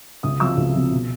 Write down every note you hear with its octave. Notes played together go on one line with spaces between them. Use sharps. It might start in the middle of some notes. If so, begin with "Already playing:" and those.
C#2 D#6
C3 F3 E6
C#2
C3 F3
B2